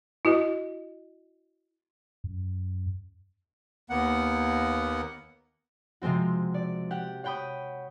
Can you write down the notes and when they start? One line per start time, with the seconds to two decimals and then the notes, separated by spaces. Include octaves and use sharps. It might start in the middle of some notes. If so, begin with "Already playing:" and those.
0.25 E4 F#4 D#5
2.24 F#2
3.90 D#2 A#3 B3 F#5
6.02 C3 F3 G#3 C4 F#4
6.54 D5
6.91 G4 F#5
7.24 C#5 F#5 G5 B5 D#6